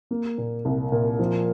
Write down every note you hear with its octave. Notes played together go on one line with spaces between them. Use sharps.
A#3
A#2
C2
A#2
F3